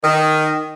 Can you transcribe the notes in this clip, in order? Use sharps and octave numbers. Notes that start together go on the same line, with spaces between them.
D#3